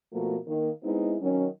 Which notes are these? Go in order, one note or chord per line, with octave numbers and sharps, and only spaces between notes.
B2 F3 A3 A#3 F#4 A#4
D#3 A#3
G#3 B3 C4 D#4 E4
D#3 F#3 C#4